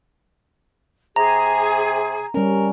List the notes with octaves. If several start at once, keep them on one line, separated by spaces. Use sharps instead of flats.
C3 G#4 A#5
G3 C#4 A#4